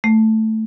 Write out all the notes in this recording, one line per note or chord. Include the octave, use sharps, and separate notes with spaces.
A3